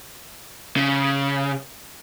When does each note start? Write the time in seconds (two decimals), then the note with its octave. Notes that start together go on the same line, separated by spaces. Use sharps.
0.77 C#3